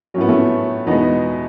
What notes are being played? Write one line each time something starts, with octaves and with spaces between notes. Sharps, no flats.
A2 F#3 B3 C#4
A3 C#4
E2 B2 G#3 B3 D#4